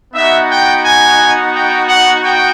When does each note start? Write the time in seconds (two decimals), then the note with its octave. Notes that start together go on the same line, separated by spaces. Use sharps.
0.14 B3 D#4 F#4 E5
0.49 G5
0.84 G#5
1.53 G5
1.87 F#5
2.22 G5